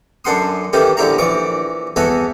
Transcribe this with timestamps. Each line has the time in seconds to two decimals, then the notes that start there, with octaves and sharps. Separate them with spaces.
0.25 F#2 D4 A4 F#5 C6 D#6
0.73 D#3 E3 C#4 G4 A4
0.97 A#1 D3 E4 G4 C#5 A#5
1.18 A#1 E3 D5 C#6 D6
1.96 E2 F#4 A4 C#5 E5 G#5